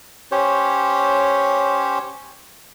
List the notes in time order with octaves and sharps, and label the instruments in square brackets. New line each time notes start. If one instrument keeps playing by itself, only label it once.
[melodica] C#4 G4 C5 C#5